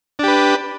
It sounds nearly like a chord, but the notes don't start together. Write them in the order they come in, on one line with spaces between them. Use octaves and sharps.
D4 G4 B4